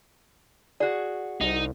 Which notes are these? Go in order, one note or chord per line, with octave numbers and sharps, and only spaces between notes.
F#4 G#4 D5
C2 D#4